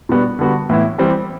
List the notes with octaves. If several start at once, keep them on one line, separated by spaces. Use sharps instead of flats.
B2 G3 B3 D4 F#4
D3 G3 B3 F#4
A2 E3 B3 E4
E3 G3 C4 G4